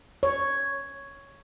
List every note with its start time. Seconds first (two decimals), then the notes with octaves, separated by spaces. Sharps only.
0.23 C#5